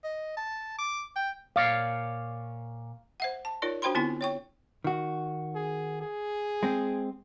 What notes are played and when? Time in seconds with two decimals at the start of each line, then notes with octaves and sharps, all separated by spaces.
0.04 D#5
0.37 A5
0.78 D6
1.16 G5
1.56 A#2 C#5 D5 F5
3.20 C5 E5 F#5
3.45 A5
3.62 D#4 F4 A#4 C#5 D5
3.82 D4 F#4 C5 G5 B5 C6
3.95 D3 B3 C4 E4 F4 G#5
4.21 C#5 G5 C#6
4.84 D#3 F#4
5.55 G#4
6.01 G#4
6.63 G#3 C4